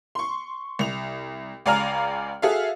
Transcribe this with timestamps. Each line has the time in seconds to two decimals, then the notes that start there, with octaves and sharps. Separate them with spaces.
0.15 C6 C#6
0.79 C2 F7
1.66 C#2 D5 F5 G#5 A#5 F6
2.42 F#4 G#4 A4 E5 F5